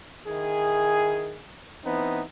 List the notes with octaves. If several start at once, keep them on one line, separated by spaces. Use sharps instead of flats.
D#3 E4 G#4
E3 B3 C4 D#4